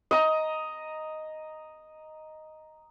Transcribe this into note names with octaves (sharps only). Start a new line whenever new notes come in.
D#5 A#5